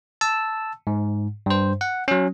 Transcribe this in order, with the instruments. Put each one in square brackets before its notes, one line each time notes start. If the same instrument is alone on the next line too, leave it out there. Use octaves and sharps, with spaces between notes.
[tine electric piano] A5 E6
G#2
G2 C5
F#5
F#3 C#4